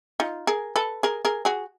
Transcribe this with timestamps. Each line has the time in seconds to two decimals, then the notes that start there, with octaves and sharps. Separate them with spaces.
0.20 D#4 F4
0.47 G#4 A#4
0.76 A4 B4
1.03 G#4 A#4
1.25 G#4 A#4
1.45 F#4 G#4